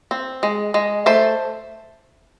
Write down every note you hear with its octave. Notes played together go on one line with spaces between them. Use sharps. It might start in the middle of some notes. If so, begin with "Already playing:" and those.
C4
G#3
G#3
A3 C5